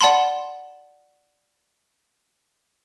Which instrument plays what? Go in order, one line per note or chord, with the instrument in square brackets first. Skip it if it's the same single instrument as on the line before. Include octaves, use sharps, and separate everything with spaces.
[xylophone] D5 F#5 A5 B5 C6